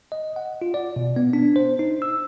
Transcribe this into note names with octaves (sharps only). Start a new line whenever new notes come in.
D#5
F#5
F4
D5
B2
B3
D4
C5
D#4
E6